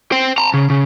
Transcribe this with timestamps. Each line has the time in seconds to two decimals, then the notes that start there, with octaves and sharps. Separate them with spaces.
0.12 C5 G5
0.38 A5 A#5
0.54 C#3
0.70 C#3